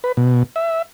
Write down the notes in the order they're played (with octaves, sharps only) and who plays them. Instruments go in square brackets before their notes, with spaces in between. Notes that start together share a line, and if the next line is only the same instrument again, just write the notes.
[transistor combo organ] B4
B2
E5